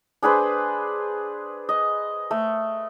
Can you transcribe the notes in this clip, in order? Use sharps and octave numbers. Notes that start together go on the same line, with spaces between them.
D4 G#4 B4 C5
D#5
A3